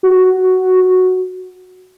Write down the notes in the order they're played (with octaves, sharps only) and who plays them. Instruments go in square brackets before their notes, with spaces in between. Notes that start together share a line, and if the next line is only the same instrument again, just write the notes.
[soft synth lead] F#4